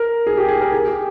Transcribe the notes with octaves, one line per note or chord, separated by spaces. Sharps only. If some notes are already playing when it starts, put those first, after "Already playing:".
Already playing: A#4
G#4
G4
G#4
A#4
G#4
G4